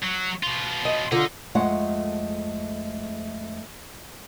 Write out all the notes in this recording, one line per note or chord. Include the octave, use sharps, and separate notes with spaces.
F#3
B2 F4
D#5
D3 D#4 F4
F2 G#3 A3 F#5